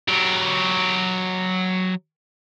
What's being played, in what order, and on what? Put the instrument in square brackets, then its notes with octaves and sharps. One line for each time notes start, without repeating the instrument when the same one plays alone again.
[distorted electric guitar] F#3 G4